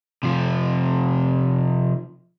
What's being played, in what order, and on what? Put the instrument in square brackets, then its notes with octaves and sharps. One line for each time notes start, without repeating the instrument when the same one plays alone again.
[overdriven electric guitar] C3 F3